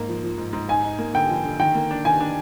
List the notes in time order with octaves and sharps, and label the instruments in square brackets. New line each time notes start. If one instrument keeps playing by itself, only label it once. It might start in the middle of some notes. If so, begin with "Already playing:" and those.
Already playing: [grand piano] G#2 A#3
F3
F3
G#2
G#2
[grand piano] D#4 [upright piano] G#5
[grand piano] D#4
A#3
[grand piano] D3 [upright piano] G5
[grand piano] F3
D3
[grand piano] D#3 [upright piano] G5
[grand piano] A#3
D4
[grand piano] D#3 [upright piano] G#5
[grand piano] D4